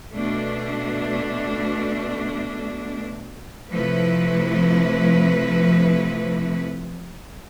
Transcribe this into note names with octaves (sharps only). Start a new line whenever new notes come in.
B2 A3 D4
C3 F3 A3 E4 B4